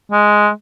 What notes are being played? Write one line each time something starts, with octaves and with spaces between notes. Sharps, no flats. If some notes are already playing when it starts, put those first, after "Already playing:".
G#3